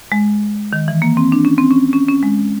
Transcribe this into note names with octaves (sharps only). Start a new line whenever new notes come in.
G#3
D#3
E3
A#3
C4
D4
C#4
C4
C#4
C#4
C#4
G#3